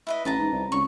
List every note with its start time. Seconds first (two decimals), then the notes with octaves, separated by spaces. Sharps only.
0.07 E4 B4 D#5
0.25 A1 B4 A5 A#5
0.38 G#2
0.52 C2
0.72 C#2 C#6